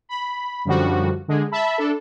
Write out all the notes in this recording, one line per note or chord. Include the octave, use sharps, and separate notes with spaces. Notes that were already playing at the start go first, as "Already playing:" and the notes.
B5
F#2 D3 F3 G3 F#4
D3 G#3 G#4
E5 A5 B5
D4 A4